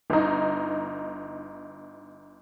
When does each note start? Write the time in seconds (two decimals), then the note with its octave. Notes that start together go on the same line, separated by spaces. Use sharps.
0.10 G1 D#4